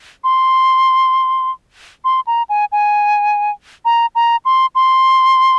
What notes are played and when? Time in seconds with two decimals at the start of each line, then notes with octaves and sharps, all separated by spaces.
0.24 C6
2.05 C6
2.27 A#5
2.49 G#5
2.72 G#5
3.85 A#5
4.15 A#5
4.45 C6
4.75 C6